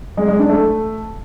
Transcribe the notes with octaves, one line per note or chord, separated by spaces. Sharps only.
G#3
G#3
D4
A3